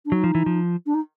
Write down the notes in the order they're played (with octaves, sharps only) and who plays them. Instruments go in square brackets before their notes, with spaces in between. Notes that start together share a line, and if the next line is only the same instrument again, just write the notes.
[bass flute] D4
[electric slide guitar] F#3 [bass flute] D#4
[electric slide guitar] F3
E3
F3
[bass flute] D4
D#4